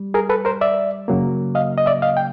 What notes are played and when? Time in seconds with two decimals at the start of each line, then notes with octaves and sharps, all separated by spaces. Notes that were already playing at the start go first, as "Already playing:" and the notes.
Already playing: G3
0.14 G#4 A#4
0.29 A4 B4
0.45 A#4 C5
0.61 D5 E5
1.08 F#2 C#3 F#3 A#3
1.55 D#5 F5
1.78 D#5
1.86 D5 E5
2.02 D#5 F5
2.17 G5